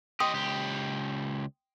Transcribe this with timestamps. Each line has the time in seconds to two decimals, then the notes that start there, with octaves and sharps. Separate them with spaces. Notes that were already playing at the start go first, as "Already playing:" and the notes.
0.20 G4 D#5 G5 C6 D#6
0.34 C#2 G4